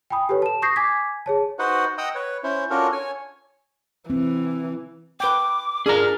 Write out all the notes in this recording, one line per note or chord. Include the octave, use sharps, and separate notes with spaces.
G5 G#5 B5 D#6
G4 A4 B4 C#5
A5 E7
C#6 D#6 G6 A#6 C7
G#5 D6 G#6 B6
G#4 C#5 A5
D#4 F#4 B4 C5 F#5
D#5 F#5 G5 A#5 D#6 E6
B4 C#5
C#4 E4 C5
C#4 D4 F4 F#4 A4 A#4
C#5 G#5
E3 C4
B4 G5 D6
D4 F4 G#4 A#4 A#5 F6